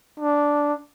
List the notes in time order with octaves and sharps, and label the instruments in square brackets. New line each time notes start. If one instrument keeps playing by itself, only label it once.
[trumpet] D4